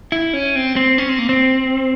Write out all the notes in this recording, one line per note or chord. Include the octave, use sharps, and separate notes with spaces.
E4
C#4
C4
C4
C#4
C4
A#3
C4